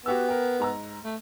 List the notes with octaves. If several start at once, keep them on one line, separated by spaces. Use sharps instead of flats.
B3 F#4 G4 E6
A#4 G5
G#2 A#5 E6
A3